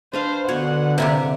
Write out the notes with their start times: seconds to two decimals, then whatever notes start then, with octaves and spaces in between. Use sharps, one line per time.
0.13 D4 B4 C5 F5
0.49 B2 D3 C#5 F#5
0.98 C3 A#3 E4 G4